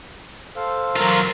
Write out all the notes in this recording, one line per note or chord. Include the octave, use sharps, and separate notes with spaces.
A4 C5 F5
F#3 F4 A#4